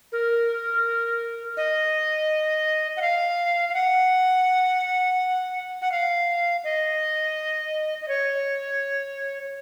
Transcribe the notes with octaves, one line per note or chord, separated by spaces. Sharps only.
A#4
D#5
F#5
F5
F5
F#5
F#5
F5
D#5
D#5
C#5